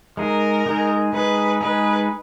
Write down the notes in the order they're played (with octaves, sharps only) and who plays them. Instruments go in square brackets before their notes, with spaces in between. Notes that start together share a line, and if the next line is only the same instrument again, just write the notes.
[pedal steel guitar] G#3 D#4 G#4 [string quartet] A#4
[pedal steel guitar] G#3 D#4 G#4
[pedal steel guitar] G#3 D#4 G#4 [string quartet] B4
[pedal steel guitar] G#3 D#4 G#4 [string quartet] B4